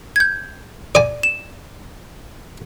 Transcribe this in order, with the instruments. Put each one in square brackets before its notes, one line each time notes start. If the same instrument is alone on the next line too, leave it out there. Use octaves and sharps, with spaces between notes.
[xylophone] G6 G#6
[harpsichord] D5 G#5
[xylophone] E7